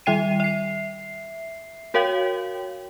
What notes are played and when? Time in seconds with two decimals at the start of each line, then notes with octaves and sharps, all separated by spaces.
0.06 D#3 G3 E5 G5 C7 D#7
0.40 E5 C7
1.94 F#4 A#4 C#5 F5 G5